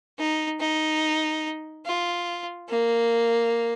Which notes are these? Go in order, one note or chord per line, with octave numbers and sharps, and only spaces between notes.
D#4
D#4
F4
A#3